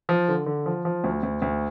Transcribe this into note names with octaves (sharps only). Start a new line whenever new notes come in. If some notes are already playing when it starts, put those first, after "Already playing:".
F3
D3
D3
F3
F3
D2
D2
D2